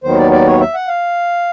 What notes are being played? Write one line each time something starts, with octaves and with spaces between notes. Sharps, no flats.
D#2 D#3 F#3 B3 C5
D5
D5
C#5
E5
F#5
F5